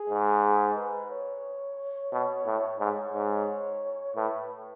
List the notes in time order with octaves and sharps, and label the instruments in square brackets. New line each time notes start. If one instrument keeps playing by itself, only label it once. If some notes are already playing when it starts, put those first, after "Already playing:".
Already playing: [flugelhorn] G#4
[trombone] G#2
[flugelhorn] B4
C#5
[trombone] B2
A2
[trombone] G#2 [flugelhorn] C#5
[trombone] G#2
[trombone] A2 [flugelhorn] B4